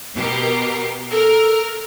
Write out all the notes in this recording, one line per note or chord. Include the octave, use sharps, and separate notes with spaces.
B2 G4 A#4
A4 A#4 F6